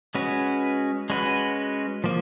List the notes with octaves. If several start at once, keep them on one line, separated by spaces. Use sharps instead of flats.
G#3 C#4 F#4 B4
G#3 C#4 F#4 B4
F3 A#3